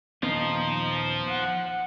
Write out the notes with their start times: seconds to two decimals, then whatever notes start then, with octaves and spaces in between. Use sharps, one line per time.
0.23 D#1 F3 B3 D#4 F4
1.27 F#5